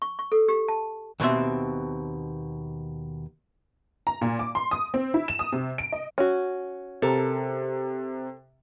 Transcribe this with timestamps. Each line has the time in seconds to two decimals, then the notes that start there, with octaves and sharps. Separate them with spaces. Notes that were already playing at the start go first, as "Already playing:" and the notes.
0.02 C#6
0.19 C#6
0.32 A4
0.49 G4
0.68 A5
1.20 D#2 B2 D#3 C4 E5
4.07 A#5
4.22 A#2
4.39 D6
4.55 C6
4.71 D#6
4.94 C4
5.14 E4
5.28 E7
5.39 D#6
5.52 C3
5.78 D7
5.92 D#5
6.18 C#4 F#4
7.02 C3 A4 A#4